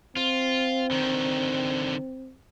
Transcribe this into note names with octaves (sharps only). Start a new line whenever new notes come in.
C4 F4
D3 D#3